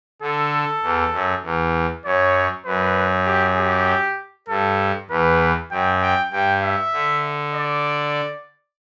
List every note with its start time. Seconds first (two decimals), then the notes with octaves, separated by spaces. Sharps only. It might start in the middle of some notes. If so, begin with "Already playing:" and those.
0.22 D3 A4
0.83 E2
1.13 F#2
1.43 E2
2.05 F#2 C#5
2.65 F#2 B4
3.26 G4
3.57 G4
4.48 G2 A4
5.10 E2 B4
5.71 F#2 G5
6.02 G5
6.32 G2 G5
6.62 E5
6.93 D3
7.54 D5